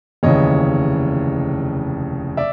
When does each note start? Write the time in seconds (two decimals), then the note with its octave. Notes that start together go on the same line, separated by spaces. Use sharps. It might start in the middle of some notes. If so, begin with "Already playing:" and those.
0.23 F1 D#2 C#3 E3 C#5 D#5
2.37 D5 E5